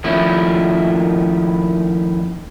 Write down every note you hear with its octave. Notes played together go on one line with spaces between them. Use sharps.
D#3 F3 A3 A#3 C#4 E4